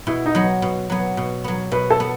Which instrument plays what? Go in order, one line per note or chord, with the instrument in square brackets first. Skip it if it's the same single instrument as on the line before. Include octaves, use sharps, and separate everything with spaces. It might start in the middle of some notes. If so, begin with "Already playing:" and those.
[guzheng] B2 [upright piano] E4
[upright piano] D#4
[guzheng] F#3 B3
B2
F#3 B3
B2
F#3 B3
[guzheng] B2 [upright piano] B4
[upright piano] A4
[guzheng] B3